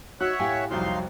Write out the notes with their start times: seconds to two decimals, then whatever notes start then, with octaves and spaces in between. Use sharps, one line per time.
0.21 D#4 F#4 C#5 E5 F#5 F#6
0.39 A2 E4 G4 F5 G5 G#5
0.71 C2 F2 F#3 D#4 F5 C6